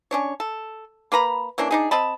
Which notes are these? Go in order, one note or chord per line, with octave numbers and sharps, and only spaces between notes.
C#4 D4 C#5
A4
A#3 B4 A#5 B5
E3 A#3 C#4 D4
D4 D#4 G#4
C4 D#5 A5 B5